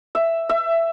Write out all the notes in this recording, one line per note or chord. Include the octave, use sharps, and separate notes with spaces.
E5
E5